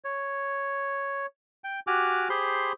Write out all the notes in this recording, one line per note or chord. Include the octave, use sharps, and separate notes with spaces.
C#5
G5
F#4 G4 G#5 D6 F6 F#6
G4 G#4 C5 B5 C6